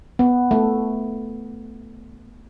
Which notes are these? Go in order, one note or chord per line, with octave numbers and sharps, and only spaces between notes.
B3
A3